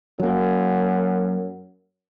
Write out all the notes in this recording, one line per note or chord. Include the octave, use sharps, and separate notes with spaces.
F#2 F#3 A#3